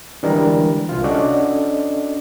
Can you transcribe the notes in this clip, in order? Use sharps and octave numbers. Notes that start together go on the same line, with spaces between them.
D3 E3 G3 G#3 D4 A#4
C2 C3 F4
C#4 D4 F#4 A4 D5 D#5